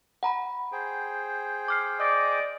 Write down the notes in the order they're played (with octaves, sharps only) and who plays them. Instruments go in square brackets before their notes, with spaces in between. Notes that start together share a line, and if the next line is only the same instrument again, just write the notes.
[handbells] F#5 A#5 B5
[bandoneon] G#4 C5 G5
[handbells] D6 F6 C7
[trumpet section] D5 D#5 D6 [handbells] G6